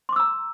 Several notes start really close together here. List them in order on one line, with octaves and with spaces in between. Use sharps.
C6 D6 E6 A#5